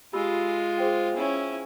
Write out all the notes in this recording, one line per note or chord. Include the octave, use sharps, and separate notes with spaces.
G#3 F4 G4 B5 E6
G#4 C5 G5
C#4 E4